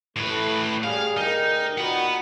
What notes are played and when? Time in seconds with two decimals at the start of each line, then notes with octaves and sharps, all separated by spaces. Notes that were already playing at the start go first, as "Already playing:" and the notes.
0.16 A2 A3 B4
0.84 G3 G#4 F5
1.17 D2 D#4 G4 A#4
1.78 A#2 D#4 F#4 F#5 B5